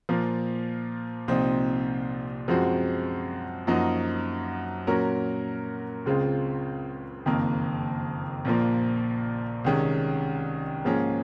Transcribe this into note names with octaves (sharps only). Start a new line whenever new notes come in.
A#2 F3 A#3
C2 A#2 F3 C4 D#4
F#2 F3 G#3 C4 F#4
F#2 F3 A#3 D#4 F#4
A#2 F#3 C#4 F#4 A#4
C#2 C#3 G#3 C4 F4
F#1 F2 D#3 A#3
A#1 A#2 F3 A#3
C2 C3 D#3 G#3 C#4
G#2 F3 A#3 C#4 G#4